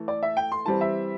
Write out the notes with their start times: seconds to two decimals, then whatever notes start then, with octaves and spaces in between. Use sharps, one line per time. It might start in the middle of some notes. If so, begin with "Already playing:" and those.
Already playing: E3 A3
0.08 D5
0.23 E5
0.37 G5
0.52 C6
0.66 E3 G3 C4 A5
0.81 E5